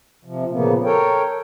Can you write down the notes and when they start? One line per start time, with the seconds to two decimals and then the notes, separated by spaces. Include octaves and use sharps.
0.25 C3 F3
0.51 A#2 C#3 F3 A#3 B3
0.84 A4 A#4 C#5 G5